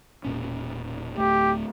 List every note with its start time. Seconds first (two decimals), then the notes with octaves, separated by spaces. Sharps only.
0.24 E1 A#2 C#4
1.17 D1 F2 A3 G4